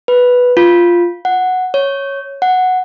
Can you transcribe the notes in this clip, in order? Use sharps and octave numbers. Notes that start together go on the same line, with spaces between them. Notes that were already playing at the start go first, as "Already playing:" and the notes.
B4
F4
F#5
C#5
F#5